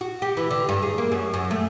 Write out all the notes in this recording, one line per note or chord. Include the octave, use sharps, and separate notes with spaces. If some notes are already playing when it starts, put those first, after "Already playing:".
F#4
G4
E3
D3
G2
G#4
A#3
F#2
F#2
A3